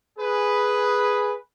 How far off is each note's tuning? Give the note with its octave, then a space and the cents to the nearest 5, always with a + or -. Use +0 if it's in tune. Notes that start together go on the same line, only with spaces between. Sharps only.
G#4 +0 B4 +0